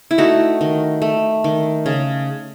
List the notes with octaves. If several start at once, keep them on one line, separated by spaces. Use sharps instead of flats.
E4
A3 D#4 F#4
D#3
A3
D#3
C#3